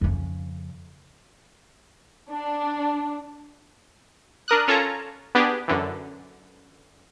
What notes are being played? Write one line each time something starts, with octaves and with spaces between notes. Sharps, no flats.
F2 C#3
D4
D4 A#4 D#6 F#6
C#4 F4 A4 C#5 A5 A#5
B3 D4 G4 G#4
F#2 D3 E3